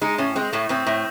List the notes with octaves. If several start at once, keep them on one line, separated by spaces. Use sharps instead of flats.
G#3 D#4
A2 C#4
G#3 C4
A2 A3
A2 C4
A2